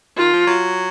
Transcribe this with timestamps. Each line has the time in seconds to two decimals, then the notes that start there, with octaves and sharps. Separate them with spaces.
0.17 D#3 F4
0.33 F3
0.47 F#3